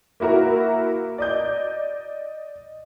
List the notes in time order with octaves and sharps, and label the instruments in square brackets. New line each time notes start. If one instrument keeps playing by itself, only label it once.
[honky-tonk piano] A#3 E4 F#4 A#4
D5 D#5 G6